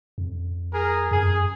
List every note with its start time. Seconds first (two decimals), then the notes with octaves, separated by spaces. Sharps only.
0.18 F2
0.72 G#4 A#4
1.11 F#2 G#4